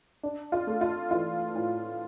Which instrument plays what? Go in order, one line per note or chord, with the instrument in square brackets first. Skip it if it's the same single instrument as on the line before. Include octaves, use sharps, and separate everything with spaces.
[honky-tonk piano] D4
F4
A3
F4
E3 F4
A2